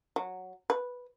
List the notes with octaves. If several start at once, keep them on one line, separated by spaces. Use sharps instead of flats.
F#3
B4